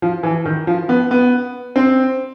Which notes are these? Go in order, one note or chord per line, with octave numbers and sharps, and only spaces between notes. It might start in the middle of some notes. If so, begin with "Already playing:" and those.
F3
E3
D#3
F3
B3
B3
C4